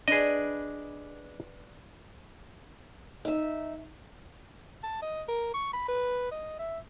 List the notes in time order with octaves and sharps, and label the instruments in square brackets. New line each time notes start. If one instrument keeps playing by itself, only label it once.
[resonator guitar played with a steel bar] D4 B4 [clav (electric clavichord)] G#4 D#5
[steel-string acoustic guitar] D#4 E5
[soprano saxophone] A5
D#5
A#4
C#6
B5
B4
D#5
E5